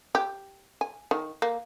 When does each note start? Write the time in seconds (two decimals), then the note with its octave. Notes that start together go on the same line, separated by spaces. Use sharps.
0.15 G4
0.81 G#5
1.11 D#3
1.42 A#3